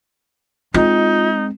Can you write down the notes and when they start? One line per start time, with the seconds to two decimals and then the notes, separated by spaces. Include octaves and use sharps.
0.74 G#3 C4 D#4 F4